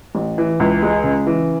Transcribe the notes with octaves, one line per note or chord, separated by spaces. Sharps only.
A1
E3
C#2
G#3
C#3
E3